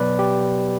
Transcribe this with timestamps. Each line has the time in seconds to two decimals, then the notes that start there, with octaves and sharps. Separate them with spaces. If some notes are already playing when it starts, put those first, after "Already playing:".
Already playing: B2 F#3 B3 B4 D5
0.19 G4